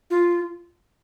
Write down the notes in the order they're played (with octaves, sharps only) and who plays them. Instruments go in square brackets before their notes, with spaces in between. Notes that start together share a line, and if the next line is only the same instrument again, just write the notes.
[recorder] F4